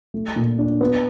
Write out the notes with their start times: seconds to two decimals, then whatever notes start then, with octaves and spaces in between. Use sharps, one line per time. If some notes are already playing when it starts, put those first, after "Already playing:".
0.14 A3
0.36 A#2
0.58 D4
0.81 B3